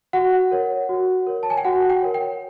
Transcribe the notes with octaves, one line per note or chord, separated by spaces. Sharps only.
F#4 F#5
A#4 C#5
F#4
A#4 C#5
A5
G#5
G5
F#4 F#5
G5
A#4 C#5
G5